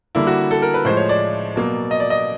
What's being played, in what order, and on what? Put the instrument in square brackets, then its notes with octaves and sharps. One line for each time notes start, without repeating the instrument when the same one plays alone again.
[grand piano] D3 G3 A#3 E4
F#4
A4
A#4
B4
A2 F3 G#3 C5
C#5
D5
B2 F#3 A#3
D#5
D5
D#5